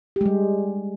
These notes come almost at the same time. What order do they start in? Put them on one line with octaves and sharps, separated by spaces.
G4 G#3 G3